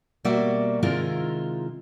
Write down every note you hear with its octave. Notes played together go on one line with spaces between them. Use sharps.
B2 G3 A#3 F#4 D5 E5
C3 D#3 G#3 E4 F4 A#4